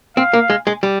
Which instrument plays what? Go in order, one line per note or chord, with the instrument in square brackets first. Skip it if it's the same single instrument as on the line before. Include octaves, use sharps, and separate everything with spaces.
[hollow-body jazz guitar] C4 [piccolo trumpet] F5
[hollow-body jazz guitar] A#3
G#3
G#3
G3